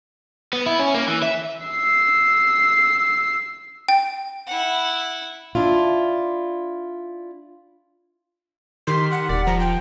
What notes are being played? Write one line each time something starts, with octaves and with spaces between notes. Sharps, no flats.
B3
E4
C#4
A#3
E3
E5
E6 C7
G5
E4 F#5
D4 E4 F4
D#3 G4 A#4 C6 B6
F#5
E1 D5
F3 A#5
G5